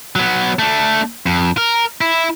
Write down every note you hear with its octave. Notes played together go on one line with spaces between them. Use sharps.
F#3 B3
A3 D4
F2
A#4
E4